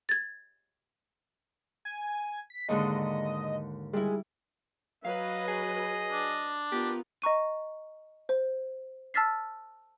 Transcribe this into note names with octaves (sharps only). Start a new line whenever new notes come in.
G#6 A6
G#5
B6
D#2 G#2 D3 D#5
G3 G#3 E4
F#3 B4 D#5 F5
G#4
D4
B3 F4 G4 A#4
D#5 A#5 C#6 D#7
C5
A5 E6 F6 A6 B6 C7